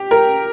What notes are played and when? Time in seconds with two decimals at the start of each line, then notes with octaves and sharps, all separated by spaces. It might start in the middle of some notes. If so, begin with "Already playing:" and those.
Already playing: G4
0.11 A#4